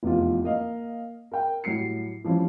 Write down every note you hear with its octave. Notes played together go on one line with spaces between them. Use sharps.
F1 E2 F4
A#3 D#5 F5
A#4 G5
A2 F#3 G3 C7 C#7
E3 F3 G3 C4 C#4